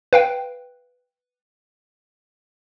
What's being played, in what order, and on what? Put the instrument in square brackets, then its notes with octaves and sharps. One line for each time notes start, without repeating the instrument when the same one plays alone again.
[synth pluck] B4 F5 G5